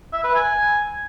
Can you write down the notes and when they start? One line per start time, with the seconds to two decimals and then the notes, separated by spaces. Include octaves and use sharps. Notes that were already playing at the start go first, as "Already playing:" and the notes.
0.13 E5
0.24 B4
0.35 G#5